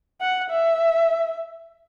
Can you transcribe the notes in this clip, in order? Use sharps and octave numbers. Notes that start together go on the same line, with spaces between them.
F#5
E5